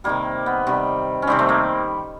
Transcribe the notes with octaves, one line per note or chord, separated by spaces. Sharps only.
C3 D#3 G3 A#3
B3
C3 D#3 G3
C#4
C3 D#3 G3 C4
A3
A#3